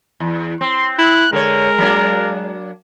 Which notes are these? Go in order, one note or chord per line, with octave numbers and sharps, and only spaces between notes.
E2
C4 C6
E4 F#6
D3 G#3 A#4 C#5
F#3 A#3 D4